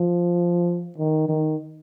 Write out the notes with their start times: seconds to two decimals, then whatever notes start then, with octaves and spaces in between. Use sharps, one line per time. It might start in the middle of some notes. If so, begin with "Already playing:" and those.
Already playing: F3
0.98 D#3
1.28 D#3